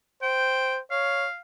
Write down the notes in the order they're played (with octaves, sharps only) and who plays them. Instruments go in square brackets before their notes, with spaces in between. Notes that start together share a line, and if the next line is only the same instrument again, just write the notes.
[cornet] C5 [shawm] G5
[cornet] C#5 [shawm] F5